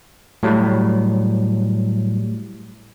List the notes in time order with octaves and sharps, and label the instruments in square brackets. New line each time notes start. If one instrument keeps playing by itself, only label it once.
[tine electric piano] A2 F#3 G3